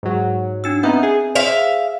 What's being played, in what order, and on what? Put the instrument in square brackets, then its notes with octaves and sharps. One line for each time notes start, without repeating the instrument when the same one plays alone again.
[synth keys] G#2 F#3
[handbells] D4 D#4 E6
[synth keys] B3 D#4 [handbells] C4 E5 G6
[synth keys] G#4
[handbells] C5 [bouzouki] E5 F5